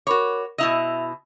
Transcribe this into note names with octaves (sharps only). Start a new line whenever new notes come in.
F#4 A#4 C#5 B5 D6
B2 E4 D#5 E5 E6 F7